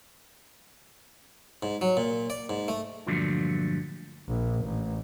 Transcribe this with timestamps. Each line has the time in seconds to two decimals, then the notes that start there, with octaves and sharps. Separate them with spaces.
1.63 G#2
1.81 F#3
1.97 A#2
2.30 D5
2.49 G#2
2.68 A3
3.07 G2 A#2 D3 F3 F#3 A3
4.28 A#1
4.64 A1